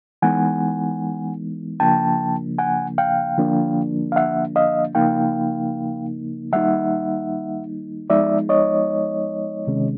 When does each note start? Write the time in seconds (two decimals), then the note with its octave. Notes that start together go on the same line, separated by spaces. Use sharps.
0.22 E3 G#3 B3 D#4 F#5 G#5
1.80 C#3 F3 A#3 D4 G5 A5
2.59 F#5 G#5
2.98 F5 G5
3.38 D3 F3 A#3 D4
4.12 F5
4.16 E5 F#5
4.56 D#5 F5
4.95 C#3 F3 A#3 D#4 F5 G5
6.52 D#3 G3 A#3 D#4 E5 F#5
8.10 F3 G#3 B3 D#4 D5 E5
8.49 C#5 D#5
9.67 C3 D#3 G#3 C#4